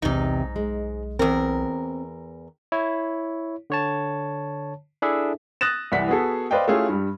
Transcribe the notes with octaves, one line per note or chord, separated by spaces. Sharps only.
B1 E2 G#2 C3 D#4
G#3
E2 C4 A#4
E4 C#5
D3 C#5 A5
D4 E4 G#4 A4 E5
D#6 F#6 A6 A#6 E7
C2 E3 D5 F#5 B6
B3 F#4 G#4 A4
B4 C5 D5 D#5 F5 G5
A3 C#4 E4 F4 G4 G#4
G2 G3